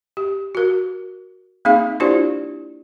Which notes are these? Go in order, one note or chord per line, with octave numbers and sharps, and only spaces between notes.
G4
F#4 A#4
A#3 C4 D#4 G#4 E5 F5
D4 E4 F4 G4 C5 D5